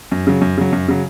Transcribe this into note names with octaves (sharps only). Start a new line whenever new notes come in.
F#2
C#3 F#3
F#2
C#3 F#3
F#2
C#3 F#3